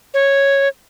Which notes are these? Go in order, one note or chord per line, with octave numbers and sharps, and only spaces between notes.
C#5